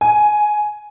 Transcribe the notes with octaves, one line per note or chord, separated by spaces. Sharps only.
G#5